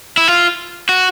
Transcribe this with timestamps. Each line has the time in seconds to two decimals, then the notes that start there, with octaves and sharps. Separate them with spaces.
0.17 E4
0.28 F4
0.89 F#4